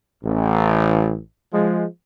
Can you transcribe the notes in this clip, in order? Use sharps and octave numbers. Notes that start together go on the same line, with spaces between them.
A1
F3 G#3